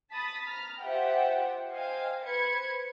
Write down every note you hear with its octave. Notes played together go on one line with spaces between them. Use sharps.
A5 B5 D#6 A6 B6
A#5 B5 F6
F4 G4 C5 E5 F#5 G5
C5 D#5 F5 G5 G#5
B4 C5 B5 G#6 C#7